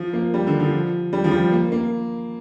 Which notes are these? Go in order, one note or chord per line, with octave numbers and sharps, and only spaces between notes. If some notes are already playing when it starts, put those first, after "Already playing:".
Already playing: F3
A#3
G3
D3
F3
G3
F3
G3
A#3
A#3